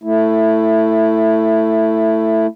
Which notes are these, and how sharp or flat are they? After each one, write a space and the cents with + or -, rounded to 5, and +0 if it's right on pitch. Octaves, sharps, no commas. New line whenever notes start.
A3 +10 E4 +0